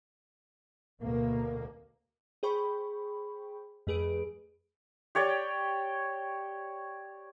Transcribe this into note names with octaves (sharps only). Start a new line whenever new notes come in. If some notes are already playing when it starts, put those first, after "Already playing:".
D2 B2 A#3
G#4 C5 G5 B5 C#6
F2 A3 G#4 B4 D7
G4 C#5 D5 G5